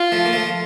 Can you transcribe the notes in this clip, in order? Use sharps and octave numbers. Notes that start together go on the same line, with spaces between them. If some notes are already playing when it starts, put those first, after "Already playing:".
Already playing: F4
F3 A3
A#3
F3 A3